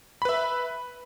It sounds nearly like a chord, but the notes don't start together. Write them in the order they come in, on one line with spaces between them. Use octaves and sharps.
B5 B4 E5